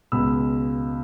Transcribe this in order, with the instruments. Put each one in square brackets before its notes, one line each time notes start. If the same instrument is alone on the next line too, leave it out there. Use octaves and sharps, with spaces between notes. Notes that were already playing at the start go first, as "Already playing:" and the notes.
[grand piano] C#2 B2 G#3 B3 B5 E6